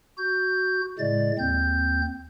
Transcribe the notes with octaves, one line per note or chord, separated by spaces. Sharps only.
F#4 G6
A2 C#3 G#3 D5 A6
D#2 C4 G6